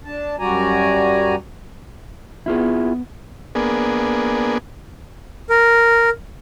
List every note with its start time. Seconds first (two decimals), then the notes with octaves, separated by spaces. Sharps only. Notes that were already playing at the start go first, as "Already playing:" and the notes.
0.05 D4 A5
0.39 F#2 G3 F#4 D5 G#5 A#5
2.46 B3 E4 F4 G#4
3.55 A#3 B3 D4 G#4
5.49 A#4